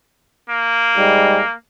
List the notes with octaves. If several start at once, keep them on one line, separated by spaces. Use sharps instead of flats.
A#3
G#2 G3 G#3